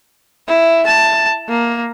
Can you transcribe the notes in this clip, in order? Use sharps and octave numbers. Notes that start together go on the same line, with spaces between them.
E4
A5
A#3